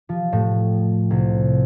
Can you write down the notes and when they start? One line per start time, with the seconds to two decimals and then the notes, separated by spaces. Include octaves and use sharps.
0.09 F3
0.33 A2
1.10 C2